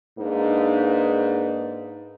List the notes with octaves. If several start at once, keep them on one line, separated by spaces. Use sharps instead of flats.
G#2 A#3 D4 D#4 B4